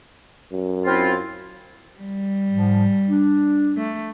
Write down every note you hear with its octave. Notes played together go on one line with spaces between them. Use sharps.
F#2
C4 E4 F4
G3
G#2 F3
D4
A3